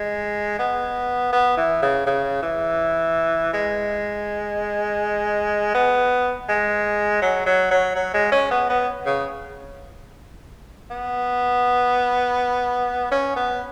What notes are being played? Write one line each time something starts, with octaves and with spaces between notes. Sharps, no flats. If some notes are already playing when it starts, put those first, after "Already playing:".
Already playing: G#3
B3
B3
E3
C#3
C#3
E3
G#3
B3
G#3
F#3
F#3
F#3
F#3
G#3
C#4
B3
B3
C#3
B3
C#4
B3